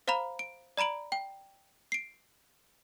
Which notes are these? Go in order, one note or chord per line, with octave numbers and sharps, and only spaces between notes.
C5 F5 A#5 B5 F7
D7
D5 A#5 B5 D7 F#7
G5
C7 D7